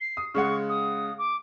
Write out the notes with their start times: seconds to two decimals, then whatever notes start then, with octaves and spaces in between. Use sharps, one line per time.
0.01 C7
0.17 D#6
0.34 C#3 G#3 F#5 C#6
0.70 D#6
1.18 D6